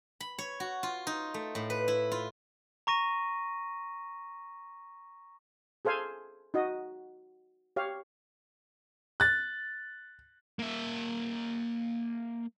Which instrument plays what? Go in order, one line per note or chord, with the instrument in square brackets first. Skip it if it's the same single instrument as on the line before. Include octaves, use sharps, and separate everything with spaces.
[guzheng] B5
C#5
F#4
F4
D#4
A3
A2
B4
E4
F4
[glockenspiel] A#5 C#6 A#6 D#7
[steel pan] G#4 A4 C5 F5 G#5
D#4 F#4 D#5
G4 C#5 F5
[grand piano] F#6 A6
[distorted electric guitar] A#3 E5